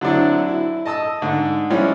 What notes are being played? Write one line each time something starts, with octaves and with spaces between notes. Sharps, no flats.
D3 F#3 C4 D4 E4
E4
D#5 A5 D#6 E6
G#2 D3
F3 G3 G#3 C#4 E4